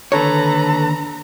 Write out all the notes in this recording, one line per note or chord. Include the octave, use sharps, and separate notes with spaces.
D#2 D3 A4 B4 C#5 A#5